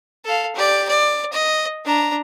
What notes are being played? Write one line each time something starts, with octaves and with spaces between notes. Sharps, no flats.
A4 F5
G4 D5
D5
D#5
D4 A#5